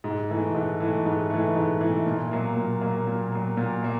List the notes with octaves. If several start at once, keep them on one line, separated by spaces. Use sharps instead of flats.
G#2
E3 A3
G#2
E3 A3
G#2
E3 A3
G#2
E3 A3
A#2
F#3 A#3
A#2
F#3 A#3
A#2
F#3 A#3
A#2
F#3 A#3